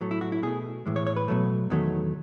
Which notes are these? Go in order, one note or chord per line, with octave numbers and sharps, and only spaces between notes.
A2 F#3 A3
E4
F#4
E4
B2 A3 G#4
A2 E3 G#3
C#5
C#5
B4
B2 F#3 A3
E2 D#3 F#3 A3